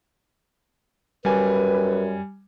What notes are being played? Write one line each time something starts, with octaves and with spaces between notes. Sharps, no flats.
F#2 G3 B4 G#5